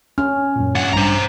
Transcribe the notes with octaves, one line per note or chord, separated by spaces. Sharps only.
C#4 F6
F#2 A#2
C#2 G2 F#5
A1 G2 C5 A#5